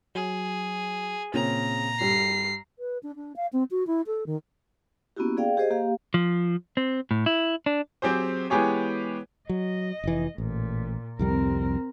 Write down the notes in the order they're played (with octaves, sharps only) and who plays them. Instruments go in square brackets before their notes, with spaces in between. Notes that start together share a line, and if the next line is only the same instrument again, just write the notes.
[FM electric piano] F#3 [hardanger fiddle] G#4
[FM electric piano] A#2 [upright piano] C#3 C4 [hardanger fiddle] A#5
[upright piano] G2 G3 [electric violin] C7
[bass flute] B4
D4
D4
F5
C4
F#4
E4
A4
D#3
[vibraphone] A#3 B3 C#4 E4 F#4 G4
G#4 D5 F5 G5
G4 G#4 C5 D#5
A#3 G4 F5
[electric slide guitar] F3
C4
A2
E4
D4
[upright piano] F#3 C4 G4 G#4 C5
E3 G#3 B3 G4 G#4 C#5
[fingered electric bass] F#3 [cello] D#5
[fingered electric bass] F1 E3
[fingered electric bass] A1 [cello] A#2
[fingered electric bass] C2 F2 G3 [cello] C4 A#4